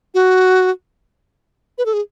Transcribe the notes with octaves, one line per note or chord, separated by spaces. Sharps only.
F#4
B4
A4
G#4